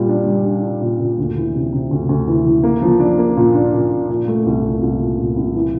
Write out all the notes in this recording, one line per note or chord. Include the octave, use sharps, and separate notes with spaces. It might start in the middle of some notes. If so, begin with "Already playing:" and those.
Already playing: A#2 G3
D4
G3
D4
D4
A#2
A#2
D2
E3
C3
C3
D2
D2
E3
E3
A#3
F3
D4
A#3
A#2
D4
A#2
D4
A#2
A3
C2
C2
C2
A#2
A#2
C2
E3